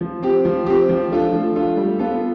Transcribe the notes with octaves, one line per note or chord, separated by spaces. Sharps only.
F3
C4 G4
F3
C4 G4
F3
A3 D4 F4 A4
F3
A3 D4 F4 A4
G3
B3 F4 A4